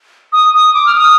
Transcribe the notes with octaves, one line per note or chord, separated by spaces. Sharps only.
D#6
D#6
D6
F6
D#6